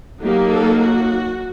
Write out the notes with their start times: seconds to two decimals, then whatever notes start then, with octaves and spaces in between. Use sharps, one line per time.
0.22 F#3 A#3 D#4 G4
0.50 A4
0.79 F#4